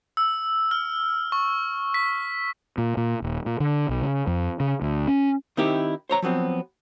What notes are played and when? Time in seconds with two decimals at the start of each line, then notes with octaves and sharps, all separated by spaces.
0.17 E6
0.71 F6
1.32 C#6
1.94 B6
2.78 A#2
2.97 A#2
3.22 D#1
3.46 A#2
3.60 D3
3.89 B1
4.02 C#3
4.27 F2
4.60 C#3
4.82 D2
5.07 C#4
5.57 D#3 C4 D#4 E4 G4
6.09 C5 C#5 A#5
6.22 F3 F#3 B3 C4